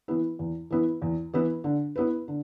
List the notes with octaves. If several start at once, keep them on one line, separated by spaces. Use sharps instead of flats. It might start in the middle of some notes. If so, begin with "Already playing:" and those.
E3 B3 E4
E2
E3 B3 E4
E2
E3 B3 E4
D3
B3 E4 B4
D3